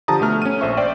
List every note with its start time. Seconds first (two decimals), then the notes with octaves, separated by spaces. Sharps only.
0.08 D3 F3 G4 A5 A#5 D#6
0.21 B2 A3 F6
0.42 C#4 D#7
0.61 A#1 C5 E5 C#6
0.77 C5 D5 E5 G5